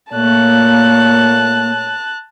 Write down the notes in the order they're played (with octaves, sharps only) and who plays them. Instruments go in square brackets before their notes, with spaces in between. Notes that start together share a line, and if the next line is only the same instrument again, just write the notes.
[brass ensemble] A#2 A3 C#5 [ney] A#3 [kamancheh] A5 F#6